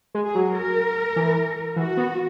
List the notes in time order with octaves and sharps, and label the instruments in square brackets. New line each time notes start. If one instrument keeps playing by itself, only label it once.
[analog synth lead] G#3
[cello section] G#4
[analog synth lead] F#3
[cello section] A#4
[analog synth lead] E3
[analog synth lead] E3 [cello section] F#4
[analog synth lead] B3